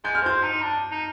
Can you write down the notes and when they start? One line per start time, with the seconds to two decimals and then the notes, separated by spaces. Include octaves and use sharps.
0.04 G#3 G6
0.15 F6
0.23 C4 G6
0.43 D#4
0.62 D4
0.92 D#4